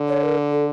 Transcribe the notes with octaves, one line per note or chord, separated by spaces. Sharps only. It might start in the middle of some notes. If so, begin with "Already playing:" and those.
Already playing: D3
C#5
A#4
A4